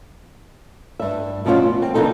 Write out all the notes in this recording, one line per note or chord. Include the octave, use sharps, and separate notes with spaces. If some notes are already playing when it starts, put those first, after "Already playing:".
G2 E5
D2 B2 F3 C#4 F4 F#4
B3 F4
C4
D3 E3 F3 A#3 D#4 A4